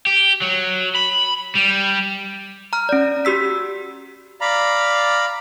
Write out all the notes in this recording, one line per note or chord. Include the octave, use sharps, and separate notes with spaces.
G4
F#3
B5
G3
A#5 F6
C#4 D5
F#4 G4 E6 B6
D5 F5 A#5 B5